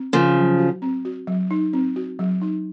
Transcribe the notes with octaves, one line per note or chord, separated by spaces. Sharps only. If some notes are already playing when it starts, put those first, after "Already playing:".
Already playing: C4
C#3 F3 A#4
F#3
F#4
C4
F#4
F#3
D#4
C4
F#4
F#3
D#4